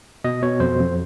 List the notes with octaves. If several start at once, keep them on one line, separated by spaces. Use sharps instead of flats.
B2 D#5
B2 C#5
F2 C5
F2